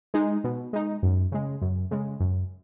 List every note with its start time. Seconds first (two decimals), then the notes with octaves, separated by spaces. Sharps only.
0.14 G#3 D#4
0.44 B2
0.73 G#3 D#4
1.03 F#2
1.32 C#3 G#3
1.61 F#2
1.91 C#3 G#3
2.20 F#2